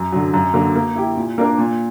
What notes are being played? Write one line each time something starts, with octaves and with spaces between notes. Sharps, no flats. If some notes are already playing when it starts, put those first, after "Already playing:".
Already playing: F#2
D3 F#3
F#2
D3 F#3 A#3
A#3
E4 G4
A#2
A#3 D4 A#4
A#2